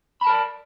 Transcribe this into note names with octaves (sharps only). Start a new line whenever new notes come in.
A#4 D5 A5 B5